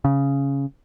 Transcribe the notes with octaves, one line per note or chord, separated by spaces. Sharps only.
C#3